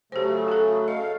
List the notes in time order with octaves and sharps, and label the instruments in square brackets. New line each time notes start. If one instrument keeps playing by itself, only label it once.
[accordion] C#3 F#3 A3 [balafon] G4 C5
[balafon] F#4 A4
[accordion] A3 F5 [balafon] D#5